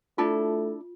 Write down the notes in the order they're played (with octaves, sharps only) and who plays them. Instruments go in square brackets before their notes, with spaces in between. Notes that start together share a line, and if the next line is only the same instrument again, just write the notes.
[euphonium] A3 [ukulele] D4 E4 A4 [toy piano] F4